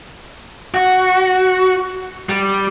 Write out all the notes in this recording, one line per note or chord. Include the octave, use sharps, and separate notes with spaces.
F#4
G3